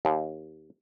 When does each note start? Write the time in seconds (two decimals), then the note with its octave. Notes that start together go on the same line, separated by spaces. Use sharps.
0.05 D#2